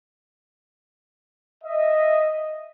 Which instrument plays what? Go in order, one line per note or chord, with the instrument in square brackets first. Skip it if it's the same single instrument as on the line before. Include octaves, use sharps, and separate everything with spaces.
[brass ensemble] D#5 E5